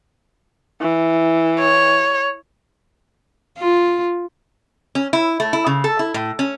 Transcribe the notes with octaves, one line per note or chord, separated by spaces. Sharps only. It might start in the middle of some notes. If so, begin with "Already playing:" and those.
E3
C#5
F4
C#4
E4
A3
E4
C#3
A4
E4
A2
C#4